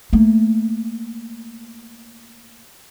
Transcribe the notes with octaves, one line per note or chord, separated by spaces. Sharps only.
A3 A#3